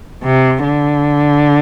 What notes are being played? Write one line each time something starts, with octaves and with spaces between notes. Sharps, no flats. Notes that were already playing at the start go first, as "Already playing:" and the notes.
C3
D3